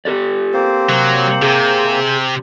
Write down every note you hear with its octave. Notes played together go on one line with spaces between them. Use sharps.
G4 A4 D5
A#3 C4 C5
C3 F#3
C3 G#4